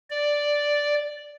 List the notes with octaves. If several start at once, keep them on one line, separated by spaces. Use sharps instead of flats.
D5